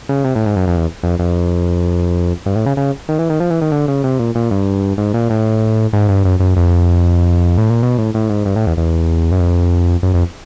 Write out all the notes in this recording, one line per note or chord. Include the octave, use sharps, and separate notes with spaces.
C#3
C3
A2
G#2
F#2
F2
E2
F2
F2
G2
A2
C#3
C#3
D#3
E3
D#3
F3
E3
D#3
D3
C#3
C3
A#2
A#2
G2
G#2
A#2
A2
G#2
G2
F#2
F#2
F2
A2
A#2
B2
A2
A2
G#2
G2
A2
E2
E2
F#2
F2
F#2
F2